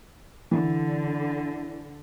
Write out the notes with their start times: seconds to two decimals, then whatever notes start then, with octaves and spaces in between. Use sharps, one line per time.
0.51 D3 E3